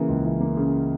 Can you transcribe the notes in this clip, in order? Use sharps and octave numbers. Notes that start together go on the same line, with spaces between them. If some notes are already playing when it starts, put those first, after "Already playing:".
Already playing: C#3 E3 A#3
C#2
E3
A#3
C#3